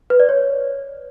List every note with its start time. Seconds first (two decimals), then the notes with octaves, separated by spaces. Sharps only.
0.10 B4
0.20 D5
0.29 C#5